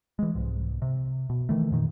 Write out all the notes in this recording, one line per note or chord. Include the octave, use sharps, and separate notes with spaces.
E3 G#3
C2 G#2
C3
B2
D#3 E3 A3
F2 A#2 D#3